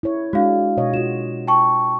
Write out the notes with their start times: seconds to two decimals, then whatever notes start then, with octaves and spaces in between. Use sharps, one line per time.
0.03 E4 C#5
0.33 G#3 D4 F#4 F5
0.77 B2 C#5 D#5
0.94 F4 F#4 E7
1.47 G5 A5 C#6